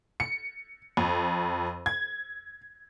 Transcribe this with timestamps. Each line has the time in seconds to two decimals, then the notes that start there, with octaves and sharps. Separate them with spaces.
0.20 C#7
0.97 F2
1.86 G#6